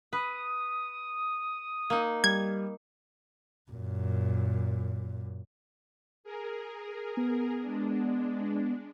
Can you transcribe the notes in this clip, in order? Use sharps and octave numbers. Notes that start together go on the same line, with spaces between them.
B4 D#6
A#3 D#4
G3 G#6
F#2 A#2
G#4 A#4
B3
G#3 D4